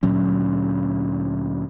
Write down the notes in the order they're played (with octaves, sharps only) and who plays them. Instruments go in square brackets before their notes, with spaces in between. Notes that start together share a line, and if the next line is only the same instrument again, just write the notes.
[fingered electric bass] D2 A#2 F#3 C#4